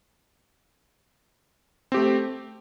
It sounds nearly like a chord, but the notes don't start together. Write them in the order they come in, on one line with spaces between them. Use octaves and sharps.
C4 G4 A3